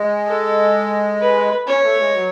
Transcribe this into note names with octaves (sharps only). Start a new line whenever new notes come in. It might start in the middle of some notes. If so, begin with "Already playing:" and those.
Already playing: G#3
A4
B4
C#4 C#5
A3
G#3
F#3